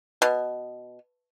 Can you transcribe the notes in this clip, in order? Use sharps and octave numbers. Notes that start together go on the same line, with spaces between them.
B2